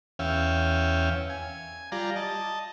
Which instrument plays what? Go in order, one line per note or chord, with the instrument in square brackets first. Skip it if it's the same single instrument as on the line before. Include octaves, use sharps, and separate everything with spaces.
[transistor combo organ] E2 C#4 E5 F5 G5
G#5
G3 F4 D5 A#5
D#5 A5